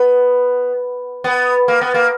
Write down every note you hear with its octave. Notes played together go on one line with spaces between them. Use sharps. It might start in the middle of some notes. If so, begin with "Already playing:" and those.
Already playing: B3
B3
A#3
B3
A#3